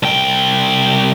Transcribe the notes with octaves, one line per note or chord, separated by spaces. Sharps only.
C2 G5